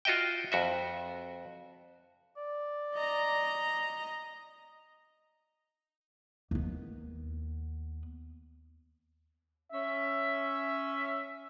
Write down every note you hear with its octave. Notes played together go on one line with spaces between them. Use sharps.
F4 F#4 D#5 E5 G5
F2 F#4 E5
D5
D#5 A#5
D#2 B3
C#4 E5